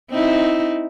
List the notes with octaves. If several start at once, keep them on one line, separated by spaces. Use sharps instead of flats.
C4 D#4 E4